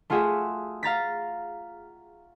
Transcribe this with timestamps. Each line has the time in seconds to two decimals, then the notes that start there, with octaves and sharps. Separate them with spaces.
0.10 A3 F4 F#4 G#4 E5
0.83 F5 A#5 A6 B6